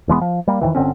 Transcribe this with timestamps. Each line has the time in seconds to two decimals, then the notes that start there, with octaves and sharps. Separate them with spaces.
0.08 E1 E3 G#3 B3
0.21 F3
0.48 G3 A#3
0.61 F2 A2 D#3 E3
0.75 G1 D3 C4 C#4